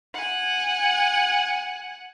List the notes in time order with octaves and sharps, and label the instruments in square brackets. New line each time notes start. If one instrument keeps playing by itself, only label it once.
[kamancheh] F#5 G#5